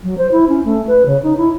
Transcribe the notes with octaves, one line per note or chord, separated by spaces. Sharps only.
F#3
C5
E4
C#4
A3
B4
C#3
D#4
E4